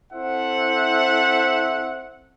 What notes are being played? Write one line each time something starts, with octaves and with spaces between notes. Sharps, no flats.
C4 E4 A4 C5 E5 F#5